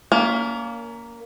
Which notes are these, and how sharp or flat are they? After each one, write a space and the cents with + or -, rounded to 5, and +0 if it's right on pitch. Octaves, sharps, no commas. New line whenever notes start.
A#3 +0 C#4 +40